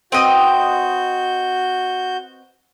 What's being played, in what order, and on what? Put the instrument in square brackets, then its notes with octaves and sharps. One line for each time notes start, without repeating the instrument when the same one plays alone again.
[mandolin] C4 B4 D#5 [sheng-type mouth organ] F#4 G6